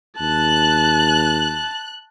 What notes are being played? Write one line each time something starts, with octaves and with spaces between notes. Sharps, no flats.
D#2 A5 F#6